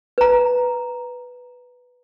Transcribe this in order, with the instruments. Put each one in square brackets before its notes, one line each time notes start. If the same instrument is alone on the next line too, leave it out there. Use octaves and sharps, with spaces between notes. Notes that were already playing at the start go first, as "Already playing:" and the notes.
[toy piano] B4 A#5